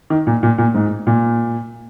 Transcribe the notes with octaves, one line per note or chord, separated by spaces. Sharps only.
D#3
A#2
A#2
A#2
G#2
A#2